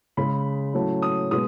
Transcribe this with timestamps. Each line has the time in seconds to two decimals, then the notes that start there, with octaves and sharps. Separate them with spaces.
0.17 C#3 G#3 C#4 B5
0.74 A2 F#3 A3 C#4
1.02 D#6
1.31 B2 G#3 B3 D#6